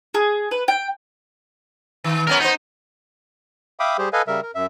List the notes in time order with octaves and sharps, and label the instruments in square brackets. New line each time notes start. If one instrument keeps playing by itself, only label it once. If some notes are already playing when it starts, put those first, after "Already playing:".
[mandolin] G#4
B4
G5
[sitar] D#3
[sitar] F#2 B3 C#5 [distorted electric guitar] A#4
[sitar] B3 C5 [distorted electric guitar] D#4
[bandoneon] E5 F5 G5 B5 D6 D#6
G3 G4 G#4 C5
A4 B4 D#5 F5 G#5
C#3 G3 A#4 E5
A#4
F#2 E5